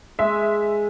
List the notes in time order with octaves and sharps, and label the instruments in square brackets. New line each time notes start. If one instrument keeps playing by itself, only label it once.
[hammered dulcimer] G#3 [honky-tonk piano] E5